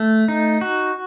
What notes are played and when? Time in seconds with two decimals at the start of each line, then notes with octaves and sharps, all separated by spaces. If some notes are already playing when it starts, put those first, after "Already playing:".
Already playing: A3
0.28 D#4
0.61 F#4